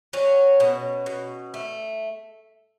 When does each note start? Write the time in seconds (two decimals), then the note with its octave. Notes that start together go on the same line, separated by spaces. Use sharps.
0.13 F#3 C#4
0.60 B2
1.06 B2
1.54 A3